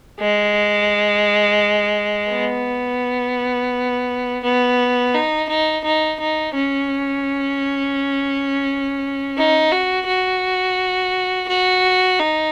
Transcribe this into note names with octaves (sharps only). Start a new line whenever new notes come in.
G#3
B3
B3
D#4
D#4
D#4
D#4
C#4
D#4
F#4
F#4
F#4
D#4